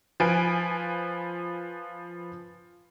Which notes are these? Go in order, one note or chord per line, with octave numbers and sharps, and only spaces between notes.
F3 B4 G#5 D7